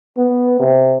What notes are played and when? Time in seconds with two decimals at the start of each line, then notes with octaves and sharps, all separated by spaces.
0.17 B3
0.59 C3